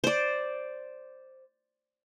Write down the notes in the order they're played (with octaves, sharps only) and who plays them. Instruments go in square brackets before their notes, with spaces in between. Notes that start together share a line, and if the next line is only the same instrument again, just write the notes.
[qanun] C5 D5